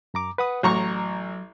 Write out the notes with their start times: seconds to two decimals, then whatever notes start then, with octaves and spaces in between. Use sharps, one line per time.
0.14 F#2 A#5 D6
0.38 B4 F#5 D#6
0.63 A1 F#3 A#5 C#6